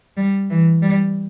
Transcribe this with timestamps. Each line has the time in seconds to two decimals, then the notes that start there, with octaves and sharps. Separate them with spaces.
0.17 G3
0.50 E3
0.82 G3